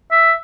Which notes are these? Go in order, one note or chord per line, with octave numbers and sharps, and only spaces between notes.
E5